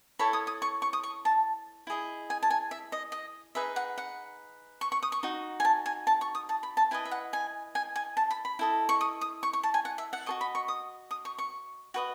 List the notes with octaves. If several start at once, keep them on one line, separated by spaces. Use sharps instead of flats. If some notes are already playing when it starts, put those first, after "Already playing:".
E4 A4 C#5 B5
D#6
D#6
C#6
C#6
D#6
C#6
A5
E4 G#4 D#5
G#5
A5
G#5
E5
D#5
D#5
D#4 G#4 B4 E5
F#5
F#5
C#6
C#6
D#6
C#6
D#4 F#4
G#5
A5
G#5
A5
C#6
D#6
A5
B5
A5
E4 B4 D#5 G#5
E5
F#5
G#5
G#5
G#5
A5
B5
B5
E4 A4 D#5
C#6
D#6
D#6
C#6
C#6
A5
G#5
F#5
E5
F#5
F#4 A4 D#5 C#6
B5
C#6
D#6
D#6
C#6
C#6
F#4 B4 D#5